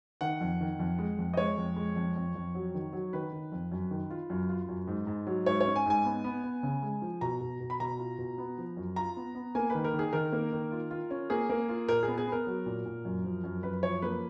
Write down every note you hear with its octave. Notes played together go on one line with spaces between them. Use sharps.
D#3 F#5
F2
D#3
F2
G#3
F2
D#5
G#3 C#5
F2
G#3
F2
F2
F2
F#3
D#3
F#3
D#3 B4
D#3
F2
F#2
D#3
F4
F#2
F4
F#2
G#2
G#2
F#3
G#2 C#5
C#5
C#4
G#5
G#2 G#5
B3
B3
B3
C#3
G#3
F3
B2 A#5
B2
B2
B5
B2 A#5
F4
B2
B3
F3
F#2
F4 A#5
B3
B3
A#3 G#5
D#3 B4
A#4
D#3
G#4
D#3 A#4
A#3
D#3
F4
F4
C#4
A#3 G#4
A#3
F4
A#2 A#4
G#4
B3
G#4
B3 A#4
F#3
A#2
A#2
F#2
F3
F#2
F#2 B4
F3 C#5
A#3 B4